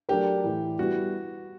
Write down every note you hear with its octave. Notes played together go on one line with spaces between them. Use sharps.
F#3 A3 D4 F#4 G4 A#4
A2 E3 A3
G3 B3 E4 F#4 G4